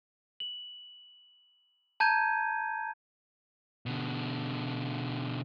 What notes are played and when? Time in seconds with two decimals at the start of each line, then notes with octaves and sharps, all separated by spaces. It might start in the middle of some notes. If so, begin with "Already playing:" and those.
0.40 F#7
2.00 A5 A#5 G6 G#6 D#7
3.86 B2 D3